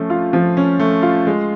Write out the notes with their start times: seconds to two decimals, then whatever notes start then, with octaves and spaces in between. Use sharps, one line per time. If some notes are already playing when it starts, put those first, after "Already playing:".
Already playing: F3 A3 C#4
0.10 F4
0.33 F3
0.57 C#4
0.79 A3
1.02 F4
1.27 G#3